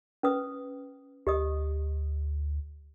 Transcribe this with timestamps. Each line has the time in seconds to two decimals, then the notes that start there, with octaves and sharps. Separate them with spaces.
0.23 C#4 B4 D#6
1.27 D2 G4 D#5 D#6